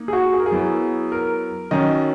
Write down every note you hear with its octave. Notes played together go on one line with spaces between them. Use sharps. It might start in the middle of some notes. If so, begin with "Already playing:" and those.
Already playing: A#3 D#4
G#4
F#4
G#4
A#4
G#4
F#3 B3 E4
A#4
D#3 F#3 C#4 D#5